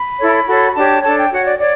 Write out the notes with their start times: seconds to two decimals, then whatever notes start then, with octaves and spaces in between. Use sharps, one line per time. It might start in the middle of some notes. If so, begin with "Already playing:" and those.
Already playing: B5
0.18 E4 A4 C#5
0.47 F#4 A4 C#5
0.75 D4 G4 C#5 A5
1.03 D4 A4 C#5 A5
1.17 G5
1.31 F#4 C#5 F#5
1.45 D5
1.60 C#5 D5